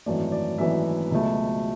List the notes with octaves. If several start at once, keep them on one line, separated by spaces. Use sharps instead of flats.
G#1 F#2 E3 A3 D5
D5
G#1 F#2 E3 A3 E5
C#2 B2 F#3 A3